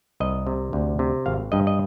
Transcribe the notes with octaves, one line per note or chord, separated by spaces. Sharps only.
C2 D#5
C3
D2
C3
G#1 F5
G2 D#5
D#5